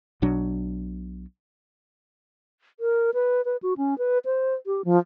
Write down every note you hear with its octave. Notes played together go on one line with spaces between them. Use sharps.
B1 B2 F#3 D4
A#4
B4
B4
F#4
C#4
B4
C5
G4
F3